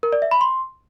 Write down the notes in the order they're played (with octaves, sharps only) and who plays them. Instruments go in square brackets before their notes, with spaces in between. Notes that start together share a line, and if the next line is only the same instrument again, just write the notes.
[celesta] A#4
D5
E5
B5
C6